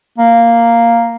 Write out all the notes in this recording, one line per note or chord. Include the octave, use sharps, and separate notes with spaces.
A#3